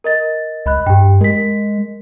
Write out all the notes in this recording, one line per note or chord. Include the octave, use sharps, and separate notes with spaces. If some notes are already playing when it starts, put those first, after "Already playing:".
A#4 D#5 A6
C#2 D#5 B5 F#6
G2 G4 G5
G#3 A#4 B6